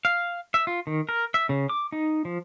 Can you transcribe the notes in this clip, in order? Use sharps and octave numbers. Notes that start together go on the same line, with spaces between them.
F5
E5
F4
D#3
A#4
E5
C#3
D6
D#4
F3